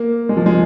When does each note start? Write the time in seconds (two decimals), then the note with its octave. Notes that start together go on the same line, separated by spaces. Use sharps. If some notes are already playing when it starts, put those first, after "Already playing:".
Already playing: A#3
0.29 G#3
0.37 F3
0.46 G#3